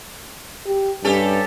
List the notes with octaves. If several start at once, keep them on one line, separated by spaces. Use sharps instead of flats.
G4
G2 C#4 G4 A4